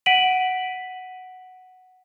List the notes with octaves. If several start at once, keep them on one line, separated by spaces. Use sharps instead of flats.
F#5 B6 D7 D#7 F#7